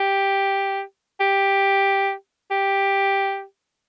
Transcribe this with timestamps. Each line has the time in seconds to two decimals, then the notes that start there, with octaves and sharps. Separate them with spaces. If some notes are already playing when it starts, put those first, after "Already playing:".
Already playing: G4
1.20 G4
2.51 G4